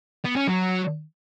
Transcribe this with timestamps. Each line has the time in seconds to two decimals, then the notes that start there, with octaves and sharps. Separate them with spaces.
0.25 B3
0.36 C#4
0.47 F#3